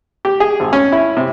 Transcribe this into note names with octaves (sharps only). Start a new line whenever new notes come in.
G4
G#4
G#1
C#4
E4
C3